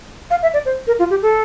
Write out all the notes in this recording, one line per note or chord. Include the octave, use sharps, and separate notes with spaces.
F5
E5
D5
C5
A#4
F4
G4
A4